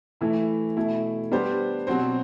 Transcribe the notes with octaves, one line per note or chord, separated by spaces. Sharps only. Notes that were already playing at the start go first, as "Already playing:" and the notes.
E3 A3 E4
B2 A3 E4
G3 B3 D4 G4 C5
B2 F#3 C4 F#4 C5